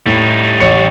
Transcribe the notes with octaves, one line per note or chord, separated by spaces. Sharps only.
A2 G3 D#4
A1 C#5 C#7